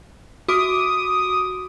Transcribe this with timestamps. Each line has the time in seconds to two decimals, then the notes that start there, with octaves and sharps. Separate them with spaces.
0.48 F#4 D6 D#6 D7